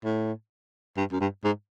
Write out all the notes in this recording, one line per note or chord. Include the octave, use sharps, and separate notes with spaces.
A2
G2
F#2
G2
G#2